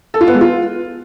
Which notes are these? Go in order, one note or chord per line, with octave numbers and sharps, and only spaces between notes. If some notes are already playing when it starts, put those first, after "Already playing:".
A4
F4
B3
G#3
F4